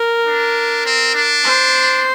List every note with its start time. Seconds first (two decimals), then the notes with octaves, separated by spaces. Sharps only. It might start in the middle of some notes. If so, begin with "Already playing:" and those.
Already playing: A#4
0.27 D4
0.86 C4
1.15 D4
1.44 C5